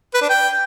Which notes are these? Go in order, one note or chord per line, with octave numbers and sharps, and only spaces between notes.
B4
D4
G5